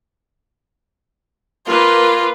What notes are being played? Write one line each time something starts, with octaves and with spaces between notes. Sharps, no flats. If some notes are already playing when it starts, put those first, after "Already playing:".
A#3 F4 B4